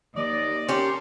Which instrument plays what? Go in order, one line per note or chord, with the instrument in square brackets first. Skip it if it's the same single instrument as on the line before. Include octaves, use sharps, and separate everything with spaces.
[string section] D#2 [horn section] D5 [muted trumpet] D#5
[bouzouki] C#4 G4 [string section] A4 A#4 [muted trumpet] C6